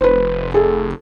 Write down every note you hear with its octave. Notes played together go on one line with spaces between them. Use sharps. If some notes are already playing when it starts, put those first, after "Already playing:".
F1 B4 C5
G#4 A4